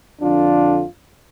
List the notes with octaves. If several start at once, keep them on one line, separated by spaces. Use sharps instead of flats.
F2 D3 F3 D4 F4